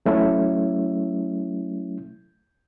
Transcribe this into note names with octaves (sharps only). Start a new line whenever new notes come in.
F#3 A3 C#4 E4